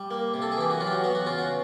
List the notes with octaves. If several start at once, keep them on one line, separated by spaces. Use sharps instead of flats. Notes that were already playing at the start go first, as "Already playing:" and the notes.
Already playing: G3
A#3
C3
A4
G#4
E3 G4
F#4
F#3 F4
G4
F#4
B3 F#4
F#4
C#3 F4
F#4